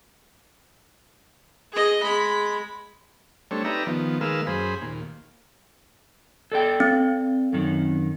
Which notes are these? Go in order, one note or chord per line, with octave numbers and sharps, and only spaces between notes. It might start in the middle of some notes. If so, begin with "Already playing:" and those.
G#4 D#5
G#3 B5
G3 A3 C4 D4 C#5
D#4 G4 B4 D5 E5 A#5
D#3 F3 B3
D#3 G#3 A#3 B4 F5 E6
F#2 G#4 C5 B5
D#2 A#2
A4 D5 G5
C4
F#2 D#3